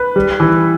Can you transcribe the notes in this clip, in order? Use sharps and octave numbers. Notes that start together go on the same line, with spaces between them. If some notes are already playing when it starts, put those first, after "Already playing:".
Already playing: B4
G3
E3